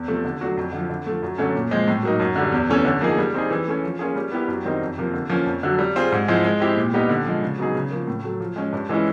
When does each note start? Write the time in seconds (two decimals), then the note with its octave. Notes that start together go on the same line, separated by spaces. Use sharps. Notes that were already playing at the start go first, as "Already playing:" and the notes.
Already playing: E2
0.08 C3 F3 A3
0.25 D3
0.41 F#3 A3 D4 F#4
0.57 F2
0.73 D3 F3
0.90 D3
1.06 F3 A3
1.23 F#2
1.38 D3 F#3 A3 C#4
1.54 A#2
1.71 F3 G#3 C4
1.88 A2
2.03 F#3 A#3 D#4
2.20 F#2
2.36 D3 G3
2.52 E2
2.70 C3 E3 A3 C#4
2.85 D3
3.01 F3 A#3 D#4 G#4
3.18 G3
3.34 C4 D#4 G#4
3.50 E3
3.67 A3 C#4
3.84 F3
3.99 A#3 C#4 F4 G#4
4.16 G3
4.32 B3 E4 G4 A#4
4.48 F#2
4.65 D#3 G3 C4 D#4
4.82 F2
4.98 C3 F3 A#3
5.14 D3
5.30 F3 A#3 C#4
5.46 F2
5.63 D3 F#3
5.79 G3
5.96 C4 F4 G#4
6.12 G#2
6.28 F3 G#3 C4 E4
6.45 G#3
6.60 C4 E4 G4
6.77 A#2
6.93 G3 B3 D#4 G4
7.09 D3
7.26 F3 G#3
7.42 C#3
7.58 F#3 B3 D#4 G#4
7.75 C#3
7.91 F3 A#3
8.08 A2
8.24 F#3 A3
8.40 F3
8.56 G#3 C#4
8.73 G2
8.89 E3 G#3 C#4 E4